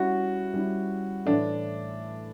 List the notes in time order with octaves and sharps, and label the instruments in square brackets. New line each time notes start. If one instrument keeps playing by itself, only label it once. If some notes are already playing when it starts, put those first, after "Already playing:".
Already playing: [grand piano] G3 C#4 E4 [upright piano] F#4
[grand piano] G3 C#4 E4
[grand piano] A2 E3 A3 [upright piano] D4